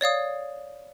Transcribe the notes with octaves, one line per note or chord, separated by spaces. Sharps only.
C#5 D5 F5 D#6